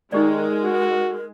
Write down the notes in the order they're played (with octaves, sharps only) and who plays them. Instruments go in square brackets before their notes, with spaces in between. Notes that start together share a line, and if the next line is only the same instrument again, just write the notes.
[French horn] D#3 [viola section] G#3 [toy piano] D#4 G4 D5 [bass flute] A#4
[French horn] F#4